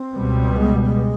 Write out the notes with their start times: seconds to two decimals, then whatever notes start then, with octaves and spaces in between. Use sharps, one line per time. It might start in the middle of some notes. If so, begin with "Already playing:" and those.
Already playing: C4
0.14 C#2 B2 G3 B3
0.56 G#3
0.85 G#3